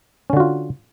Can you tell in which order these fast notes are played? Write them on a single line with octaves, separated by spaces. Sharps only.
C#4 D3 F#4 F4